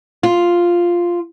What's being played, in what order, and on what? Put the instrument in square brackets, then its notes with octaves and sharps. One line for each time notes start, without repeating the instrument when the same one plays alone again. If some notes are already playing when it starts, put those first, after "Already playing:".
[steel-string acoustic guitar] F4